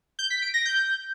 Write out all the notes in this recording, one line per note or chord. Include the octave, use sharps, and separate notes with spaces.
G6
B6
D7
A#6
G6